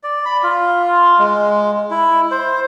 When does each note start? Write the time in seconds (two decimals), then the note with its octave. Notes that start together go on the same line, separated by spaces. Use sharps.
0.03 D5
0.25 B5
0.43 F4
1.19 G#3
1.91 E4
2.31 C5